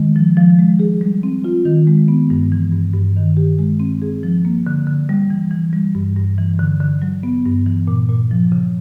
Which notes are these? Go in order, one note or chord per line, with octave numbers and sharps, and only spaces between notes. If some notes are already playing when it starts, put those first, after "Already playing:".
Already playing: D#3 G#3
F3
F3
G#3
G#4
G3
C4
F4
D#3
G#3
B3
G2
E3
G2
G2
D#3
G4
G#3
C4
G#4
F3
A#3
D3
D3
G3
E3
E3
G3
G2
G2
E3
D3
D3
F#3
B3
G2
E3
A#2
A#2
F3
C#3